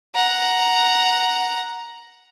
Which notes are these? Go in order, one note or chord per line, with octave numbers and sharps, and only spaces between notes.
F#5 A#5